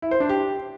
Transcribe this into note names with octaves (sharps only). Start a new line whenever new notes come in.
E4
C5
D4
G4